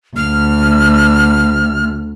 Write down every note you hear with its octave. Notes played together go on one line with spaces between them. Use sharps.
D2 F6